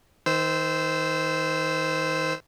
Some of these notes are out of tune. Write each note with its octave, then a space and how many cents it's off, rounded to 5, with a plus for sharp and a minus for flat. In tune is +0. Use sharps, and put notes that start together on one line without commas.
D#3 +25 C5 -15 E6 -5